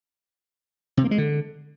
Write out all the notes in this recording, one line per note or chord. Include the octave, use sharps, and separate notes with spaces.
C3
A#3
G#3
D3